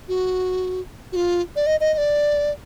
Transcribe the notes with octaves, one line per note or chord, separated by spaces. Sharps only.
F#4
F#4
F4
D5
D#5
D#5
D#5
D5